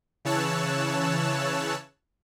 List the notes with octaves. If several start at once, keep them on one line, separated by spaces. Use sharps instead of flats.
C#3 E3 C#5 A5 E6 F#6